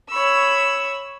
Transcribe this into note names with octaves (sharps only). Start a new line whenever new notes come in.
C#5 B5 E6